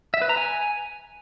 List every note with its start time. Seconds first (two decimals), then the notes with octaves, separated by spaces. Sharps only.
0.14 E5
0.22 B4
0.29 A#5
0.37 G#5